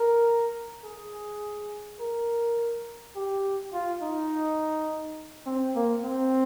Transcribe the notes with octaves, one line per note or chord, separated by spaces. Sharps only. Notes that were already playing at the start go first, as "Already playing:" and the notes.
Already playing: A#4
G#4
A#4
G4
F4
D#4
C4
A#3
C4